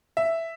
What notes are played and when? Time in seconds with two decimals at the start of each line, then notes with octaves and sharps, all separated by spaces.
0.17 E5